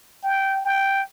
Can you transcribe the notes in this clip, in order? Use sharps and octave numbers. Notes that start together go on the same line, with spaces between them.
G5
G5